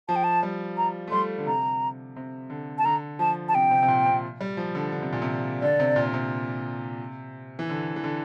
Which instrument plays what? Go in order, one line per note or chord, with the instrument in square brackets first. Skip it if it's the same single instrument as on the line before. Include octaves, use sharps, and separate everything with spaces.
[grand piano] F3 [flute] A5
[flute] G5
A5
[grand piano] G3
[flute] A#5
[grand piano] A3
[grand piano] G3 [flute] C6
[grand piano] D3
[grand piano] C3 [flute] A#5
[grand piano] C3
D3
[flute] A5
[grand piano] D3 [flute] A#5
[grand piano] F3 [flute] A5
[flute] A5
[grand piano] C3 [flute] G5
[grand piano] C3
C3
A#2
C3
G3
F3
D3
D3
C3
A#2
C3
[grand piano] D3 [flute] D5
[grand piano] C3
A#2
C3
E3
D3
E3
D3